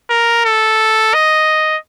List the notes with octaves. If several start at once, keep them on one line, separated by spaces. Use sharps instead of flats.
A#4
A4
D#5